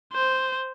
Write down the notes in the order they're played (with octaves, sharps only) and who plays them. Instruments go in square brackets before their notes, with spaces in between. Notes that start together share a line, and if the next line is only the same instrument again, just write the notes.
[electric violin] C5